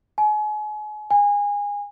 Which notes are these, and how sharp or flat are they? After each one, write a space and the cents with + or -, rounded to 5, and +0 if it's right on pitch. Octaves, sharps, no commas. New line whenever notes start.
G#5 +35
G#5 -25